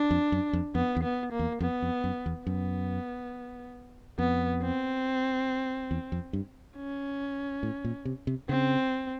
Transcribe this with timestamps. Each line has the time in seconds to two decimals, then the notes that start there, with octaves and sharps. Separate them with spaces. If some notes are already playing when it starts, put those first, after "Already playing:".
Already playing: D4
0.11 F2
0.32 F#2
0.53 F2
0.75 F2 B3
0.97 E2
1.03 B3
1.32 A#3
1.39 E2
1.61 F2 B3
1.82 F2
2.04 F#2
2.26 E2
2.47 F#2 B3
4.18 F2 B3
4.62 C4
5.91 E2
6.12 F2
6.33 G2
6.76 C#4
7.63 A2
7.85 A#2
8.05 C3
8.27 C3
8.49 C#3 C4